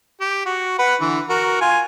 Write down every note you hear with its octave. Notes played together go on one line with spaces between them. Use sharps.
G4
F#4
B4 F#5
D3 E3
F#4 A#4
F4 G#5